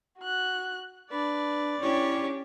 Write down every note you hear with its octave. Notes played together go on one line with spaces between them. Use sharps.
F#4 F#6
D4 B4 D5
C#4 D4 E4 G4 C#5